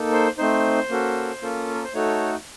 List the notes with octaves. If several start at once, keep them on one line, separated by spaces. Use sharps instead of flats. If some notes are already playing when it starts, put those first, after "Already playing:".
Already playing: A#3 D#4 A4
C5
A3 C4 D#4 C5
A#3 C#4 F#4 A4
A#3 C#4 F4 A4
A#4
C5
A3 D#4 F#4 A4 C#5